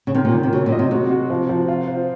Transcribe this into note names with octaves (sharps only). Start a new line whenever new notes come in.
C#3
C3 D#3
A#2
D#3
C3
C#3 F#3
A#2
D#5
C3
C3 F#4
F#4
F3
F3
F4
C5